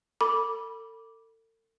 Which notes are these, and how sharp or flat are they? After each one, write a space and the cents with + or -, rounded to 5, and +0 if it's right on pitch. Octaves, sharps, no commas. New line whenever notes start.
A4 +40 B5 -20 D6 -10